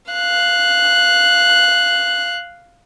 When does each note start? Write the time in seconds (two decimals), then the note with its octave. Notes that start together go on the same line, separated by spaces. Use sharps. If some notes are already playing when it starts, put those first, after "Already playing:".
0.12 F5 F#6